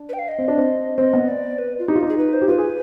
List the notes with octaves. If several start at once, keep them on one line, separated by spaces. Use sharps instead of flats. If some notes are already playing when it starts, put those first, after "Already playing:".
Already playing: D4
B4
G5
F5
D#5
C4
D4
C4
C4 D#5
B3
D5
B4
F4
D#4 G4
F4
D#4
G#4
B4
C5
G4
F4 B4
G#4